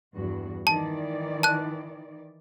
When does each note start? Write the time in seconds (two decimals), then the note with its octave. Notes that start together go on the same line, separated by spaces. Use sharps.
0.14 E2 G2 F#4
0.67 D#3 E3 D5 A5
1.43 A5 F#6